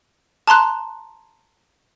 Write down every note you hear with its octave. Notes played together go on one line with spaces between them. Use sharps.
A5 A#5 C6 F#6